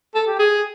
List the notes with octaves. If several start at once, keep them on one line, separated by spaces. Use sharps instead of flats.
A4
G4
G#4